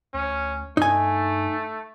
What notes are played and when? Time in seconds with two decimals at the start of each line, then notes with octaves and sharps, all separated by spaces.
0.14 D2 C#4
0.77 G2 A3 D#4 G#5